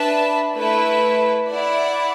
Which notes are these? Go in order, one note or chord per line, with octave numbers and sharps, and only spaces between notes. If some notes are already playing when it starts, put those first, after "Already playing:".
Already playing: D4 B4 E5 A5
A3 E4 B4
E4 D5 F#5